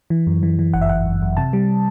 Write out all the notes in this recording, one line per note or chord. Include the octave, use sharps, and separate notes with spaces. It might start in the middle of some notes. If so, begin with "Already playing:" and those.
E3
F#2
E3
E3
G1 F#5
E5
G1 F#5
F#2
F#2
C3 A5
G3